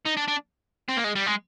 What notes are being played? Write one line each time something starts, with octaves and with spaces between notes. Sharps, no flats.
D#4
D4
D4
C4
A#3
G#3
G3
G#3